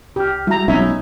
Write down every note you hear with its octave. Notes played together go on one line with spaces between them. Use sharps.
C2 G4 F6
G3 G#3 E4 F#4 A#5
B1 C#4 D#4 E4 E5